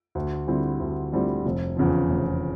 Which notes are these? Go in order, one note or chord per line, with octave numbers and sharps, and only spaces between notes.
D2
D3 G3 C4 E4
D2
D3 G3 C4 E4
F1
E2 C#3 F3
F1